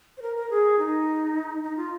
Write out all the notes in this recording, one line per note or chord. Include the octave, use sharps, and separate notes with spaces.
C5
A#4
A#4
G#4
D#4
D#4
F4